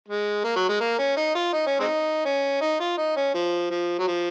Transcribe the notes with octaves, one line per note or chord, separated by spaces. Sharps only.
G#3
A#3
F#3
G#3
A#3
C#4
D#4
F4
D#4
C#4
G#3 C4 D#4
C#4
D#4
F4
D#4
C#4
F3
F3
F#3
F3